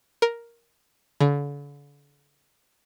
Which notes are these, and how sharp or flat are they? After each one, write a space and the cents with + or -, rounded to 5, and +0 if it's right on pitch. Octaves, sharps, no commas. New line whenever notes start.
A#4 +5
D3 -40